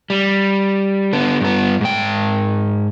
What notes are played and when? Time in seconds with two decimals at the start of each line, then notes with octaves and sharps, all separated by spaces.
0.10 G3
1.13 D3 B3
1.41 G2 B3
1.81 G#2 G5